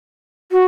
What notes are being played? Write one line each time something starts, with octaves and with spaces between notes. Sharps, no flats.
F#4